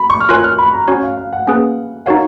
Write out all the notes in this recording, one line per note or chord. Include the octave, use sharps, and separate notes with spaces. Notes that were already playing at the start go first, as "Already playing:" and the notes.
Already playing: B5
C#6
F6
F4 A#4 C#5 G#5 F#6
F#6
F6
B5
A#5
C#4 F#4 C#5 G#5
F5
F5
F#5
A#3 C#4 G#4 B4 F5
D#4 F#4 A#4 C#5 F5 F#5